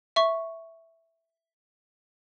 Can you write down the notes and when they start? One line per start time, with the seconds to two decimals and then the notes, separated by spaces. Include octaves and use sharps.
0.16 E5 C#6